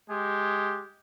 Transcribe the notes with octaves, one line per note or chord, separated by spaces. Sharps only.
G#3 G4